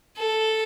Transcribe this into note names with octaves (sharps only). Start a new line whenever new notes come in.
A4